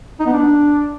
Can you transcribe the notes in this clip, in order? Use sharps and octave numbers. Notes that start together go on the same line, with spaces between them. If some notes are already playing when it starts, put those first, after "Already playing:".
D#4
B3
D4